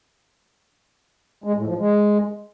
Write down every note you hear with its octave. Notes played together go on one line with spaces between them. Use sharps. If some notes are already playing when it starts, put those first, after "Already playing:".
G#3
A2
F3
G#3